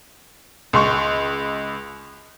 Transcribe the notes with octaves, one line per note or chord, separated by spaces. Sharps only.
C#2 C6 C#6